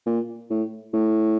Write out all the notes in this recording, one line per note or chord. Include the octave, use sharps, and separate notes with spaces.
A#2
A2
A2